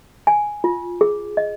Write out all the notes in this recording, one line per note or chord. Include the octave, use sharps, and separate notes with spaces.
G#5
F4
G#4
D#5